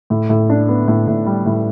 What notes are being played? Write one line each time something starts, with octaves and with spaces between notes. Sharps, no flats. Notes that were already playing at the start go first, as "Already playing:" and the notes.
A2
A2
D4
B3
A2
A2
G3
A2